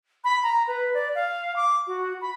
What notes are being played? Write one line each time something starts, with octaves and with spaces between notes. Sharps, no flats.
B5
A#5
B4
D5
F5
D6
F#4
B5